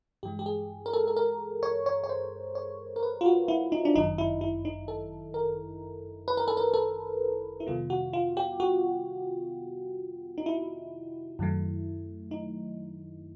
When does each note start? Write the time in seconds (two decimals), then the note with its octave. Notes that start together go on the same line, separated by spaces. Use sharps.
0.23 G2 E3 G#3 G4
0.39 G4
0.46 G#4
0.86 A#4
0.93 A4
1.08 A4
1.16 A#4
1.63 C#5
1.86 C#5
2.04 C#5
2.09 C5
2.55 C#5
2.96 A#4
3.03 B4
3.21 F4
3.26 F#4
3.48 E4
3.72 D#4
3.85 D4
3.95 G1 F#2 D#3 D#4
4.18 E4
4.41 E4
4.65 D#4
4.88 A4
5.34 A#4
6.28 B4
6.37 A#4
6.48 A4
6.57 A#4
6.74 A4
7.60 E4
7.67 F2 C3 D#3 G3 B3 F4
7.90 F#4
8.13 F4
8.37 G4
8.60 F#4
10.38 D#4
10.46 E4
11.39 F#2 D#3 F#3 A3
12.31 D#4